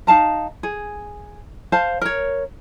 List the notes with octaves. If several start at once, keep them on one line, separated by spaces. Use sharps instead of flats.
D#4 F5 A5 A#5
G#4
C5 F5 A5
A#4 C#5